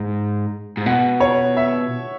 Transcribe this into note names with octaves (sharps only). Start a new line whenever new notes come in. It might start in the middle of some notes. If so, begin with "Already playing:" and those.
Already playing: G#2
G#2
B2 F#5
C#5
E5